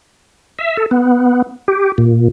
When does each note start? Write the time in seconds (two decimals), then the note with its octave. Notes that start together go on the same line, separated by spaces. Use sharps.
0.59 E5
0.77 A4
0.91 B3
1.68 G4
1.98 A#2